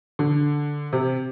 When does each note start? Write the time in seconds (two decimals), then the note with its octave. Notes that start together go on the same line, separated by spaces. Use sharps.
0.19 D3
0.93 C3